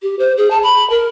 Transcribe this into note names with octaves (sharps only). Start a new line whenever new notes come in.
G4
C5
G#4
A5
B5
A#4